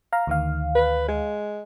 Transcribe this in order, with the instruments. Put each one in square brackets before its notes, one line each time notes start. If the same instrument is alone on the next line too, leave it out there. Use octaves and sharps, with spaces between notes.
[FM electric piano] F5 A#5
D2 D#3 F5
[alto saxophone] B4
G#3